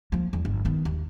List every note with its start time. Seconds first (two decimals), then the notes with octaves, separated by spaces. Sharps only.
0.12 F3 A#3
0.33 E2
0.45 G1
0.65 D#3 B3
0.85 D#2